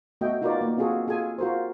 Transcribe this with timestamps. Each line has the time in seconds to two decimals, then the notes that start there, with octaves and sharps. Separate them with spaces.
0.21 A3 B3 F#4 D#5 E5 G5
0.41 D#4 F4 F#4 A#4 B4 D5
0.61 A#3
0.78 C4 F4 F#4 G#4 A4
1.07 F4 G#4 A4 G#5
1.38 F4 F#4 A#4 C5